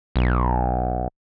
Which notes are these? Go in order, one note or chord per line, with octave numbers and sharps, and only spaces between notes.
B1